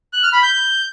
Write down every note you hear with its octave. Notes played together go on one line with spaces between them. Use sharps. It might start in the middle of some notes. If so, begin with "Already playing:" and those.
F#6
F6
B5
G6